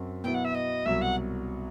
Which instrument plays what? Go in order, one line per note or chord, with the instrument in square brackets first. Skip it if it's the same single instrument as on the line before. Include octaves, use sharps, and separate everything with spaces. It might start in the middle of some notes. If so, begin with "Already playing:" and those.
Already playing: [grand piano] F#2 F#3 C4 F#4
[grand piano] B2 F#3 B3 E4 [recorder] G5
[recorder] F#5
E5
D#5
[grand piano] C2 B2 F#3 [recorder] E5
[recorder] F#5